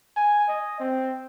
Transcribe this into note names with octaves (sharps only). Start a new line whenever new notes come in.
G#5
D#5
C4